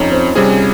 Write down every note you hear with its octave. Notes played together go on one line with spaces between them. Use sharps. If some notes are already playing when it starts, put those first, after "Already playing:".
Already playing: F2 C#4 D#4 F4
C4
C3 G3 C4 C#4 G#4